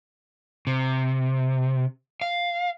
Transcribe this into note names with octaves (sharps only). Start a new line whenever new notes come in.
C3
F5